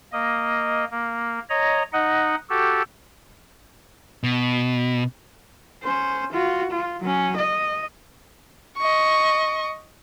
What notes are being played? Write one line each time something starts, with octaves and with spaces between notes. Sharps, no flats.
A#3 D#5
A#3
C#5 D#5 A#5
D#4 D#5 F#5
F#4 G4 A4
B2
C#4 C5
F4 F#4
F4
F#3 C#4
D#5
D#5 C#6